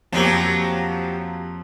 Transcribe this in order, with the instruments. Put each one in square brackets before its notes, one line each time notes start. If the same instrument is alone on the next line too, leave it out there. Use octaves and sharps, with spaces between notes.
[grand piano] F2 A#3 [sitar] F3 F#3 G4